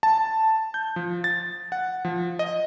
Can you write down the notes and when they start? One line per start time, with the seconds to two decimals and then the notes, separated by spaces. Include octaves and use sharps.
0.03 A5
0.74 G6
0.96 F3
1.24 A6
1.72 F#5
2.05 F3
2.39 D#5